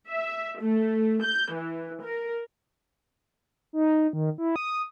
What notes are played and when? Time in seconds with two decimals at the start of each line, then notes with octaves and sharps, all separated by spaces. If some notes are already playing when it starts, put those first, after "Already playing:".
0.11 E5
0.61 A3
1.23 G6
1.55 E3
2.03 A#4
3.73 D#4
4.13 D#3
4.38 E4
4.56 D#6